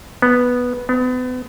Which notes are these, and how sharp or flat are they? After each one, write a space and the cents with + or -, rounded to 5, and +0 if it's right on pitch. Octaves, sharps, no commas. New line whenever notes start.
B3 -5
B3 +35